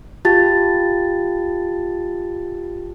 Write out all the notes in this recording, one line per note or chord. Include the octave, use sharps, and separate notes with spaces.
F4 G4 A5 A6